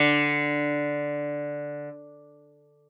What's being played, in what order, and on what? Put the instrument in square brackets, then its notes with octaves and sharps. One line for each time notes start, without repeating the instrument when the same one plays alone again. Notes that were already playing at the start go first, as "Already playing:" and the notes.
Already playing: [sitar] D3